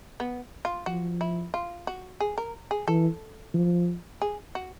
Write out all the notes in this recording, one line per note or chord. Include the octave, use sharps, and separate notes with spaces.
B3
F4
F3 F#4
E4
F4
F#4
G#4
A#4
G#4
E3 A4
F3
G#4
F#4